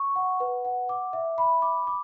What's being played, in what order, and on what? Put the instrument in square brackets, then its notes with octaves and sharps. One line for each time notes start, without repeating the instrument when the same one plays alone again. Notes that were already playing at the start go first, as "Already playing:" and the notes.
Already playing: [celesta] C#6
F#5
B4
F#5
D6
E5
B5
D6
D6